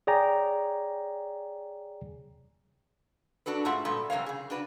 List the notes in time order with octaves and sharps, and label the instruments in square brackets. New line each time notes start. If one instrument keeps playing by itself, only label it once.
[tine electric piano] G#4 C#5 D5 G5 G#5 A#5
[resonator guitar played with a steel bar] D4 F#4 A4 B4
G#2 A3 F4 E5 F#5
A#2 G3 B3 A4 E5
C3 E3 F#3 A#4 C#5 F5
C#3 G#4
D4 F#4 B4